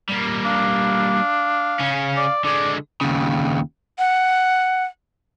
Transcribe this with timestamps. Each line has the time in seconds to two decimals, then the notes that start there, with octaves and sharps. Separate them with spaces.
0.09 G3 A#3
0.45 D4 F5
1.80 C#3 C#4
2.17 D5
2.45 D3 G#3 D5
3.01 D#2 C#3
3.99 F#5